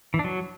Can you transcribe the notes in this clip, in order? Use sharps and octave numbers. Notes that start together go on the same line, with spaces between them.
E3
D4
F#3